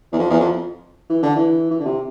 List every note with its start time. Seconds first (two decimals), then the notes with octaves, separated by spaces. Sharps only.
0.12 E2
0.19 F2
0.30 E2
0.40 F2
1.10 E3
1.23 D3
1.36 E3
1.71 E3
1.80 D3
1.86 C3